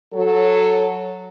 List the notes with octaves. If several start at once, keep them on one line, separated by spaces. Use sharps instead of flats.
F#3 A4